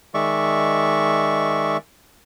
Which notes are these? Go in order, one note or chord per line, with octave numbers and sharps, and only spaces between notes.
D#3 G#3 D5 E5 C#6